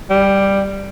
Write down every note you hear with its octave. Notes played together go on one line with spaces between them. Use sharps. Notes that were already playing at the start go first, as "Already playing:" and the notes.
G3